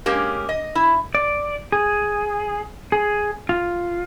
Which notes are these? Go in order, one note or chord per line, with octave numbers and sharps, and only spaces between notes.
G#3 A#3 C#4 G4
D#5
E4
D5
G#4
G#4
F4